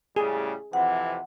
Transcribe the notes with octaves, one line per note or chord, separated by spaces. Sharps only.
A2 C#3 G3 G#4
F2 C3 E3 F#5